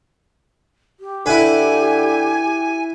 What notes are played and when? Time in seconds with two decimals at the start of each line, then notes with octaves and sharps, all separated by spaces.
1.00 G4
1.26 D3 E4 B4 G#5